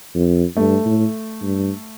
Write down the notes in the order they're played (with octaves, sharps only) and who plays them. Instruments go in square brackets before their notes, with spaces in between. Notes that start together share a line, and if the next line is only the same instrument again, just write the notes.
[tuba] F2
[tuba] G2 [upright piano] A3
[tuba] A2
G2